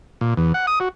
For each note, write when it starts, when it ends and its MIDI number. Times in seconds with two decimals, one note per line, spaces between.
0.21 0.34 46
0.37 0.53 40
0.54 0.66 78
0.67 0.79 87
0.80 0.89 66